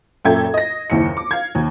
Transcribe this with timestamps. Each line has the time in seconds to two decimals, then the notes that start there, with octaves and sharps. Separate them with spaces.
0.25 F#2 A#2 A4 E5 G5 G#6
0.54 D#5 A#6
0.90 F#1 D#2 E4 C#7
1.17 D6
1.31 F5 G#6
1.55 D#2